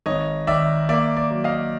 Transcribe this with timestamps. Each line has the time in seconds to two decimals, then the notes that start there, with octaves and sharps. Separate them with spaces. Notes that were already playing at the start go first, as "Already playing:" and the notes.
0.06 G#1 C#5 D#5
0.47 D#3 D5 E5
0.89 A#3 D5 E5
1.17 D5
1.31 F#3
1.44 D#5 F5